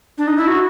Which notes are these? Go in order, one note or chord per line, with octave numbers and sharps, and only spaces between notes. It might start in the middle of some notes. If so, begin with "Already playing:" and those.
D4
D#4
E4
F#4